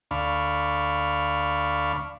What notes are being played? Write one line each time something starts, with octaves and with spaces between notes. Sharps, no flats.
D2 D4 F5 B5 C#6